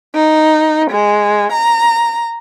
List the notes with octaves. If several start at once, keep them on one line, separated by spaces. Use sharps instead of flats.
D#4
G#3
A#5